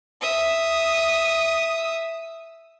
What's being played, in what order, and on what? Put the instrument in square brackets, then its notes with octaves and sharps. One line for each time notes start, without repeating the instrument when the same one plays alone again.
[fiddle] E5 D#6